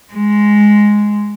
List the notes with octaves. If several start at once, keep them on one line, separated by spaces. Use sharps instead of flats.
G#3